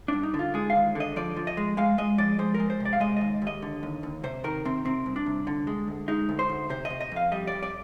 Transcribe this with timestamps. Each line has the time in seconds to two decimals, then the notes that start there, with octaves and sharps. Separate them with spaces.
0.08 G2 D4
0.23 D#4
0.34 D3
0.39 F4
0.54 G#3 G#4
0.70 F5
0.75 D#2
0.95 D3 D#5
1.16 F3 D5
1.36 F3
1.47 D#5
1.57 G#3
1.77 G#3 F5
1.98 G#3 D#5
2.18 F3 D5
2.39 G#3 C5
2.54 A#4
2.60 G#3
2.70 C5
2.80 C3
2.85 D5
2.93 F5
3.00 G#3 D#5
3.17 D#2 D#5
3.42 D#2
3.47 D#5
3.62 D3
3.83 D#2
4.03 D#2
4.24 C3 C5
4.44 D#3 A#4
4.65 C3 C4
4.85 C3 C4
5.06 C2
5.16 D4
5.26 C2
5.47 D3
5.67 G#3
5.88 D2
6.08 G#3 D#4
6.29 D2
6.39 C5
6.49 D2
6.70 C3 C5
6.85 D#5
6.90 C3
7.01 D#5
7.11 F2 F5
7.32 G3 D#5
7.47 F2 D5
7.63 D5